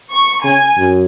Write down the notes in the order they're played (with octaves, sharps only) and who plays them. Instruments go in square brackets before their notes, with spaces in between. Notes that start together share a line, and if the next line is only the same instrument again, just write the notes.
[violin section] C#6
[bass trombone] C#3 [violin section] G#5
[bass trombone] F#2